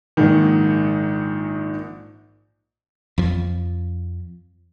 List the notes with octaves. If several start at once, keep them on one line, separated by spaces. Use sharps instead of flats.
A#1 G#2 D#3
F2 F3